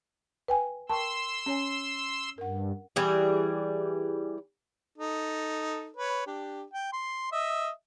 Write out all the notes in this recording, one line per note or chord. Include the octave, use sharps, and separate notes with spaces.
B4 G5 G#5
A#4 G5 A5 C6 C#6 E6
C#4 C#5 G#5
G2 A#4 F#5
E3 G3 G#4
D#4 A4
B4 C#5
D4 G4
G5
C6
D#5 E5